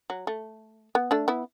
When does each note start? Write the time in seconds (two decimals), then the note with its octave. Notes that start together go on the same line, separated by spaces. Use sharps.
0.10 F#3
0.27 A3
0.95 B3
1.11 A3 D4
1.28 B3 E4